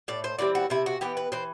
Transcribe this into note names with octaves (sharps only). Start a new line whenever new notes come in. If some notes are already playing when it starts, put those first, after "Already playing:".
A2 D5
C5
E3 G3 C4 D5
F#4
C3 E4
F#4
E3 B3 G4
B4
E3 C5